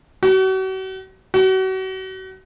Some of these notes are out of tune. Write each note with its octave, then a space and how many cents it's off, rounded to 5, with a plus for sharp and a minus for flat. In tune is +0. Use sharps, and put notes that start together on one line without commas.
F#4 +40
F#4 +35